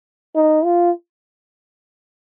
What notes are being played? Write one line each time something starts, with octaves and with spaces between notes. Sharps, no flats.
D#4
F4